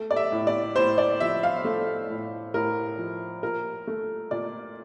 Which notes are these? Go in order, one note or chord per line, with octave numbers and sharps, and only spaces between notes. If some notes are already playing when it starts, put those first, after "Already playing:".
Already playing: A3
D5
E5
A2
D5
A2 C5
D5
F3 E5
F5
A3
A2
A2 A#4
F3
A#2 A#4
A3
A#2 D5